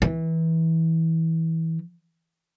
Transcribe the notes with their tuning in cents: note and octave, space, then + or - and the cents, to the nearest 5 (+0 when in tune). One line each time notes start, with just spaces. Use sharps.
E3 -20